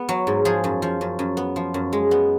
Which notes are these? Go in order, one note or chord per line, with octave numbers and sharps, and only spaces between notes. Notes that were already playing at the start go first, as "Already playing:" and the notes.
Already playing: B3
F#3
G#2
F3 G#4
F#2
F3
F#2
F#2
B3
F3
F#2
G#3
B3